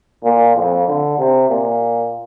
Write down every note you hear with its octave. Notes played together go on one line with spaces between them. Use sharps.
A#2
F2
D3
C3
A#2